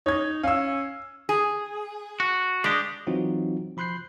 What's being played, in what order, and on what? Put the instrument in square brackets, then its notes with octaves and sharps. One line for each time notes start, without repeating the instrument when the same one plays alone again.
[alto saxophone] D#4 [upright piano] C#5 G#6
[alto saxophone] C#4 [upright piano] F5 E6
[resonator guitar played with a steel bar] G#4
[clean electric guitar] F#4
[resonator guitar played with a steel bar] G#3 [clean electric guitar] D4 G4
[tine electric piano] E3 F#3 C4 D#4 F4 F#4
F3 B5 C6 F#6 G6 C7